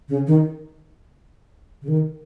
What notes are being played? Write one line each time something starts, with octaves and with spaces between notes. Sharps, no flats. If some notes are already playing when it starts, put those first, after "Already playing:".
C#3
D#3
C#3
D#3